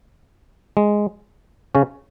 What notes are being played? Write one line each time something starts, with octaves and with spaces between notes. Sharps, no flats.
G#3
C#3 C#4